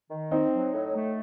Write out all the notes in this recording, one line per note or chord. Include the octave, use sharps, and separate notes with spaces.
D#3
C4 D#4
F#3
A2
A3